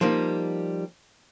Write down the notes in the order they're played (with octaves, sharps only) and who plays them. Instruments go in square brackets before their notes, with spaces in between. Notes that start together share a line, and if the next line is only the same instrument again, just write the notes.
[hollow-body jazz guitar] F3 G3 A#3 D#4